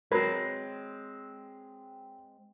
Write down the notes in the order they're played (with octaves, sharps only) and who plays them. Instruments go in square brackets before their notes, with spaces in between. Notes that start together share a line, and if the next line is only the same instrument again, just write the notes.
[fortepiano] F#3 B4 [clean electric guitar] G#3 C4 [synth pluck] A#4 B5 G#6